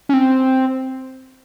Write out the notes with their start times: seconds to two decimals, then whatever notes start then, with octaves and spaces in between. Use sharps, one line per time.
0.09 C#4
0.14 C4